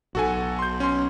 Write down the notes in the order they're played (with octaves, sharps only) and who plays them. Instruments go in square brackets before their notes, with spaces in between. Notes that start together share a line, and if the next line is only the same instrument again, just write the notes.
[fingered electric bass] B1 [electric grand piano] F#4 A4 G#5
[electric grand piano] C6 G6
C#4 C6